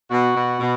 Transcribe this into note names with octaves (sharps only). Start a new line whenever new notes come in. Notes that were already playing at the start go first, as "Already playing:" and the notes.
B2 F#4
B2
B2